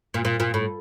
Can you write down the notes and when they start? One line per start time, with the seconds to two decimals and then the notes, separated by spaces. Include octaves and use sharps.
0.14 A#2
0.25 A#2
0.40 A#2
0.54 A2